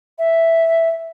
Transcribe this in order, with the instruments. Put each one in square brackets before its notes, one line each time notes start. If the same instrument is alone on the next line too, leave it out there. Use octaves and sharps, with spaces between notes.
[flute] E5